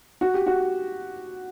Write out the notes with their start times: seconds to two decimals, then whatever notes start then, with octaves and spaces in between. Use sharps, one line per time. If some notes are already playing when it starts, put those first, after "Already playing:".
0.21 F#4
0.34 G4
0.47 F#4